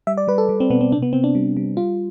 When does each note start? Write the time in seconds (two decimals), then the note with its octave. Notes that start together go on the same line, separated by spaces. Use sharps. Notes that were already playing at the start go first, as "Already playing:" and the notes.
0.07 G3 E5
0.18 D5
0.28 G3 B4
0.38 A4
0.49 G3
0.60 C4
0.70 B2 B3
0.81 C4
0.92 C3 D4
1.02 B3
1.13 C3 C4
1.24 D4
1.35 G3
1.57 G3
1.77 G3 F4